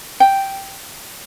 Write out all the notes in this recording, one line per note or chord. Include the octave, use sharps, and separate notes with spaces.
G5